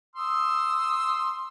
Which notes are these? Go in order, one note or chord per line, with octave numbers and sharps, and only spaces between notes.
C6 D#6 E6